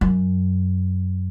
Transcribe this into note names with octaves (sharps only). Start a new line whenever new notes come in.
F#2